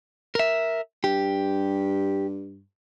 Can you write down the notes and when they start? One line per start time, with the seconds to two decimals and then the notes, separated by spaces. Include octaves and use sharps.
0.35 A#4 E5
1.04 G2 G4